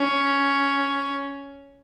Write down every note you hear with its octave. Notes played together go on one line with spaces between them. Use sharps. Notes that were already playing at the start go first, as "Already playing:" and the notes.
Already playing: C#4